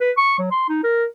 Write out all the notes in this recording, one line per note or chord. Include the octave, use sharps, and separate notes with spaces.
B4
C#6
F#3
C6
D#4
A#4